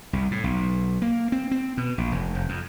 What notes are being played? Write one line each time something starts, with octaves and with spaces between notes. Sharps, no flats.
C2
A2
B1
A#3
C4
C4
B2
A#1
F1
F1
F2